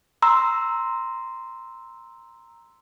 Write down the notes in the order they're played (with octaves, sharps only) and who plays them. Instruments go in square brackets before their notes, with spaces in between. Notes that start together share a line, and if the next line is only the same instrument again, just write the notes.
[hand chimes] A#5 C6 E6